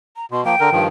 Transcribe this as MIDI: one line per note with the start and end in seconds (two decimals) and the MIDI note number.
0.17 0.26 82
0.31 0.44 47
0.31 0.44 84
0.45 0.55 53
0.45 0.55 58
0.45 0.84 79
0.60 0.70 50
0.60 0.70 70
0.72 0.88 43
0.72 0.88 51
0.72 0.88 53